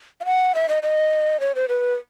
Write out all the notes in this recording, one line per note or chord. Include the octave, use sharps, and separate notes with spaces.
F5
F#5
E5
D#5
D#5
C#5
C5
B4